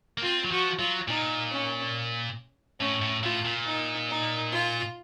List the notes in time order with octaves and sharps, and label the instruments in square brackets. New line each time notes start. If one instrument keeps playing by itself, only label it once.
[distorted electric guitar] A#3
[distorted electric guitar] C4 [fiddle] F4
[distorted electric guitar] F#3
[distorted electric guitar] F3 [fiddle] F#4
[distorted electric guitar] F#3 [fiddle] F4
[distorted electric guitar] A#2 [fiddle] D#4
[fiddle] C#4
[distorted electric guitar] A2 [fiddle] C#4
[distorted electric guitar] A2
[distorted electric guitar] A2 [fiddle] F4
[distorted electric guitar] A#2
[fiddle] D#4
D#4
F4